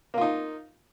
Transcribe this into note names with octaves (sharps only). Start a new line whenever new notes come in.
A#3 D#4 F4